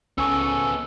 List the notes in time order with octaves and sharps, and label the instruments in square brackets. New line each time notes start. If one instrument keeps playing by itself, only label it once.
[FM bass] C#2 [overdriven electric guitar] C#3 B3 [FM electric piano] C#4 G#5 C#6 [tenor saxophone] A4